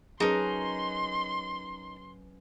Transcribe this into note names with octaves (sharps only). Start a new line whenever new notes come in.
F#3 C#4 D#4 G#4 A#4 B4 A5 C6